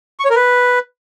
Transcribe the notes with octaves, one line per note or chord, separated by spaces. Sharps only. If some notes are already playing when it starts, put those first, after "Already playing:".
C#6
C#5
A#4
B4